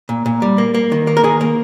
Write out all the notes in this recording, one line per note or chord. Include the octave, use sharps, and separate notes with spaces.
A#2
A#2
G3
A#3
A#3
D#3
A#3
A#4
D#3 G#4
A#3